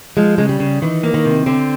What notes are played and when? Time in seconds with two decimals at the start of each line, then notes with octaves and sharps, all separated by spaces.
0.17 F3 G#3
0.38 C#3 G#3
0.49 G3
0.60 C#3
0.82 D#3 E3
1.03 A#3
1.14 D#3
1.25 C3
1.46 D3 C4